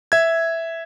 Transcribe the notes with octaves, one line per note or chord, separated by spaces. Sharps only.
E5 G#6